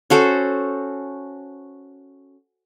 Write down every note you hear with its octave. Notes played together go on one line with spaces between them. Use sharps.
C#4 F#4 A4 C5